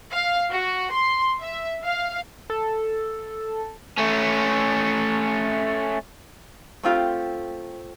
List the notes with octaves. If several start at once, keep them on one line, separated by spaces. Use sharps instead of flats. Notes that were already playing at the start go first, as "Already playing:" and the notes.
F5
F#4
C6
E5
F5
A4
A3 C#4
A3 C4 F4 G4